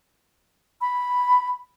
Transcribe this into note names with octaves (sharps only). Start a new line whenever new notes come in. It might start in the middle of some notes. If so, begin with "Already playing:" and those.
B5